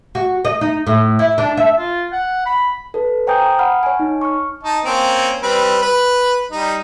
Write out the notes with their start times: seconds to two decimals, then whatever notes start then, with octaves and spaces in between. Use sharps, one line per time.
0.15 F#4
0.45 D#5
0.61 D#4
0.87 A2
1.19 E4
1.38 D4
1.57 E5
1.78 F4
2.12 F#5
2.46 B5
2.94 A4 B4
3.27 C5 G5 G#5 A#5 D#6 G6
3.59 F#5 B5 F6
3.83 C#5 G#5
3.99 D#4
4.21 C#6 F6
4.63 D#4 A5
4.84 A#3 C4 C#4
5.43 G3 C4 B4
5.82 B4
6.52 G3 D#4